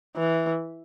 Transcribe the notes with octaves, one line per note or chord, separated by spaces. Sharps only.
E3